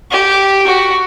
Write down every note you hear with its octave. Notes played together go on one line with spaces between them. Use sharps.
G4
F#4